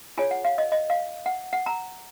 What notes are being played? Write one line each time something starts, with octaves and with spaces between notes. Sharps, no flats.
F4 G#4 C#5 G#5
F#5
F5
D#5
D#5
F5
F#5
F#5
A#5